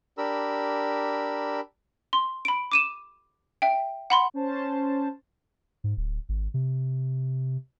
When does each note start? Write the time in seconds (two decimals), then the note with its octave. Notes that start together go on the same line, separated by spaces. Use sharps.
0.18 D4 G4 A#4 B5 E6
2.13 C6
2.45 B5 D7
2.72 D6 D#7 E7
3.62 E5 G5
4.10 F#5 B5 C6
4.34 C#4 C5 A5
5.84 G#2
5.97 D1
6.29 G#1
6.54 C3